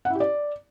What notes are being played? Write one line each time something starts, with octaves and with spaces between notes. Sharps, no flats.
F#5
E4
G4
D5